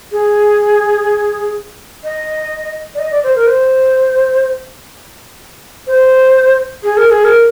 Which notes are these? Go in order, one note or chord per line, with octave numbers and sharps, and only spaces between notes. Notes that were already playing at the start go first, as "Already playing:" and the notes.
G#4
D#5
D5
D#5
D5
C5
A#4
C5
C5
G#4
A#4
G#4
A#4